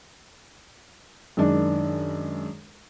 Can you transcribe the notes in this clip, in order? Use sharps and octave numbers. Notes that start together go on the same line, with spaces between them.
F#2 D#3 G#3 D4